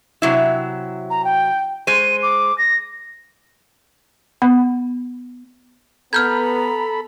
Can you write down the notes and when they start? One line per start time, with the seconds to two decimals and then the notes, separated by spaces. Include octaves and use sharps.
0.22 C3 F#3 E4
1.10 A#5
1.24 G5
1.87 G#3 C5 D#7
2.23 D6
2.58 A#6
4.42 B3 B5
6.13 B3 A4 A#5 B5 F6 G6 G#6